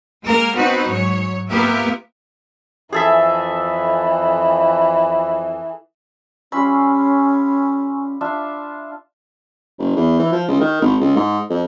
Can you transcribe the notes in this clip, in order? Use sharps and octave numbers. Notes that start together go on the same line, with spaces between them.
G#3 A#3 A#4
B3 C4 D#4 F#4 B4
G#2 F#3 C#5
A#3 B3 F4 G4 A#4 E5
F2 E3 G#4 A4 E5
G3 C#4 F4 G#5 B5 C#6 E6
D4 F4 E5
F#1
E2
E3
F3
C#2
D#3
G#1
C#2
G#2
F2